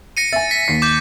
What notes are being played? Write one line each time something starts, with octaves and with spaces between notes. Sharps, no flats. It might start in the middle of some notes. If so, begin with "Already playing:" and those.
A#6 C#7 D#7
E5 G#5 A6
B6
D#2 C7
D6 G6 A6